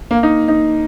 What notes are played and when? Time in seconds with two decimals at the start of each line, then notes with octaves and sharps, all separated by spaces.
0.11 A#3
0.23 D#4
0.48 D#4